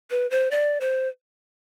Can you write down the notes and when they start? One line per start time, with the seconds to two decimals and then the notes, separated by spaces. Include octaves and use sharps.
0.11 B4
0.31 C5
0.51 D5
0.81 C5